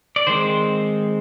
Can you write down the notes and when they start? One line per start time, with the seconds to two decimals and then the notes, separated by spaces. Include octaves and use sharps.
0.16 D5
0.27 D#3 G#3 C4 C5